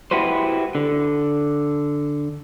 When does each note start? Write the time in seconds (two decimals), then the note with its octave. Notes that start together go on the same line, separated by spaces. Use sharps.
0.11 E4 F#4 G4 B4 C5
0.75 D3